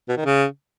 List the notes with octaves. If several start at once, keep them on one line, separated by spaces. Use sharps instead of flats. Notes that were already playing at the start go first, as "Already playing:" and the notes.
B2
D#3
C#3